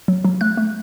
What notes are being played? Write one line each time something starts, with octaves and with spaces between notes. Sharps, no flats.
F#3
F#3
A3 F#6
A3